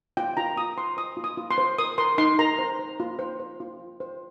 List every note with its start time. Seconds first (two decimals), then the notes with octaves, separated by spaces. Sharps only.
0.17 F4 G5
0.37 F4 A#5
0.57 F4 D#6
0.77 C5 C6
0.97 C5 D#6
1.17 F4
1.24 D#6
1.37 F4
1.51 C6
1.58 C5
1.79 A#4 D#6
1.98 A#4 C6
2.18 D#4 C6
2.39 A#4 A#5
2.59 C5
2.79 C5
3.00 F4
3.19 C5
3.40 C5
3.60 F4
3.80 F4
4.00 C5